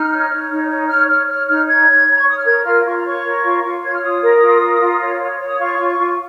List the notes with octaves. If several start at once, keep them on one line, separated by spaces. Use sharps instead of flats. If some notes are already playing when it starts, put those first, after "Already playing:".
Already playing: D#4 F6
C#5
C#5
D#4
C#5
C#5 F6
C#5 F6
C#5 F6
D#4 F6
C#5 G#6
C#5
C#5 A#5
C#6
C#5 D#6
F6
A#4 G#6
F4 F6
F4 C#6
A#5
C#5 C#6
A#4
F4
F4
C#5 G#6
F6
F4 D#6
A#4
F4
A#4
F4
C#5
C#5
C#5
D#6
F4 C#6
F4
F4